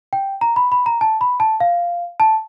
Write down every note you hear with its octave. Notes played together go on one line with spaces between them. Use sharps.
G5
A#5
B5
B5
A#5
A5
B5
A5
F5
A5